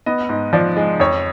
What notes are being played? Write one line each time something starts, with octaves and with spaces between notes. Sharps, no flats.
B3 D#5
G#2
F3 D5
G#3
F2 C#5